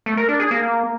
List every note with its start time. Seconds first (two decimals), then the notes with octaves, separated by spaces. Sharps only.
0.06 A3
0.17 A#4
0.29 D4
0.40 G#4
0.51 A#3